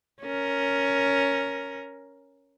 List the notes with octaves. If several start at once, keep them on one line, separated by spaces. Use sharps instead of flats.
C#4 A#4